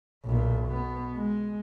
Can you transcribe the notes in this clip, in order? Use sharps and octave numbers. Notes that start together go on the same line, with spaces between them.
B1 A#2
B2 B3
G#3